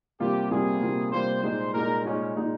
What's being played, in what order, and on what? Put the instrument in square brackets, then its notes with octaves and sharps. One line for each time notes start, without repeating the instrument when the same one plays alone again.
[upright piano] C3 G3 A#3 F4 [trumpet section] G4
[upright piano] C3 G3 A#3 F4 [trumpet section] G#4
[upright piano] C3 G3 A#3 F4
[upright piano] C3 G3 A#3 F4 [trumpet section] C5
[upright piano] A#2 G#3 D#4 [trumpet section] C5
[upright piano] A#2 G#3 D#4 [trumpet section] A#4
[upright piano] A#2 G#3 D#4 [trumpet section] C#4
[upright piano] A#2 G#3 D#4